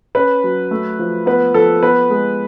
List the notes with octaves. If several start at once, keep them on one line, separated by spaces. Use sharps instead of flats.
C#4 B4
F#3
A3
F3
B3 B4
F3 A4
B3 B4
G#3